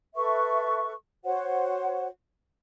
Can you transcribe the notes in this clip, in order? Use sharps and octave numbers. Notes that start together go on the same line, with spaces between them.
A4 B4 E5 C#6
F#4 C5 C#5 F#5